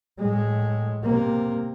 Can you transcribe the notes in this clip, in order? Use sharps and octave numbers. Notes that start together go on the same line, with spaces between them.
A2 G#3
C3 A#3